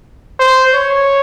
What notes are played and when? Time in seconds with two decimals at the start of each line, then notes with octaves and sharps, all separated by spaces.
0.40 C5
0.74 C#5